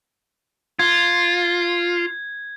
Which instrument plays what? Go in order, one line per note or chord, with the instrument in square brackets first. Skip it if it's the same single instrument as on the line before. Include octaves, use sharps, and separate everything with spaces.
[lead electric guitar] F4 [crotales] G#6